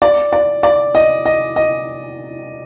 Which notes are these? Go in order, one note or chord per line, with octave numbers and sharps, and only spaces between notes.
D5
D5
D5
D#5
D#5
D#5